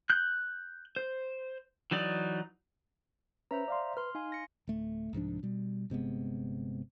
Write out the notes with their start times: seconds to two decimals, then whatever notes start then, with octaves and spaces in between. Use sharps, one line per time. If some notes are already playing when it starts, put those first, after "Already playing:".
0.10 F#6 G6
0.96 C5
1.91 E3 F#3 D#4 D5
3.51 C#4 B4 C5 E5 A#5
3.68 D5 F5 C6
3.97 B4 C6 F6
4.15 D#4 F5 G#5 C6
4.32 A#6 C#7
4.67 D1 A3
5.13 C2 G#2 F3 D4
5.43 B2 G3
5.90 G1 C3 G#3 B3